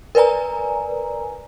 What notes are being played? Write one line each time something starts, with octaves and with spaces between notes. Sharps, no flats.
A#4 B4 D5 G#5 A#5